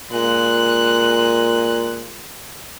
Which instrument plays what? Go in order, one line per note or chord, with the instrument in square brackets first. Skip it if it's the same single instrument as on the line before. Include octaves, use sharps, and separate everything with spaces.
[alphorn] A#2 [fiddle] G#3 F#6